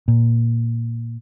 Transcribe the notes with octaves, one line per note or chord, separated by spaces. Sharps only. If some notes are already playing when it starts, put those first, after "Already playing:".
A#2